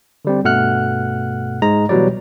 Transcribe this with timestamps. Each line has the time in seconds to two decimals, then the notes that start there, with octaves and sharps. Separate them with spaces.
0.25 D3 G3 C4
0.44 G2 B2 A3 F#5 F6 F#6
1.62 G#2 G#3 A#5
1.89 B2 E3 F#3 G3 D5